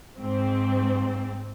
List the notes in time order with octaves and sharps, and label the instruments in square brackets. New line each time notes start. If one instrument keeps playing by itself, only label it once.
[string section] G#2 C4